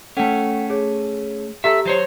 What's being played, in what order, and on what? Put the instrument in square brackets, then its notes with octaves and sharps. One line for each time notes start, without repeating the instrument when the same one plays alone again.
[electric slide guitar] A3 C#4 [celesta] A4 F#5 G5
[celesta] G#4 C#5
[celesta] G4 A#5 [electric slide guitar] A4 E5
[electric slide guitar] F#3 C5 C#5